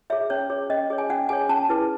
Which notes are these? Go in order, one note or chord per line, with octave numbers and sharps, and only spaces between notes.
G#4 C#5 E5
C#4 C#5
G#4 C#5
C#4 D#5
G#4 C#5
G#5
C#4 F#5
G#4 C#5 G#5
C#4 A5
E4 G#4 B4